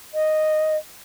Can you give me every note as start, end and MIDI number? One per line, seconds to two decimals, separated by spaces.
0.14 0.76 75